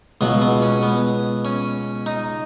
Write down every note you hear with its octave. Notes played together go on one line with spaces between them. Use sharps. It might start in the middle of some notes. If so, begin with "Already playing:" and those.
C#2 B2 F#3 B3
B3
C#4
B3
C#4
D#4